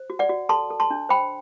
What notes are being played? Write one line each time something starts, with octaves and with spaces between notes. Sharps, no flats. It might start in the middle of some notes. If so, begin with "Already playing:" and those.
Already playing: C5
F#4
D5 F#5
F#4
A4 A5 C6
A4
A5 C6
D4
C5 G5 B5